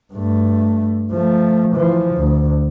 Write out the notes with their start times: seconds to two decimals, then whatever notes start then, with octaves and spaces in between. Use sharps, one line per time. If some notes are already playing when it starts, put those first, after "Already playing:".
0.13 G2 A3
1.12 F3 A3
1.75 E3 F3
2.15 D2